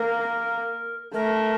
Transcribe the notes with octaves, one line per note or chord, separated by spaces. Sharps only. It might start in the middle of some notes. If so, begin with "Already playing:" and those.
Already playing: A#3 A#4
A3 A#4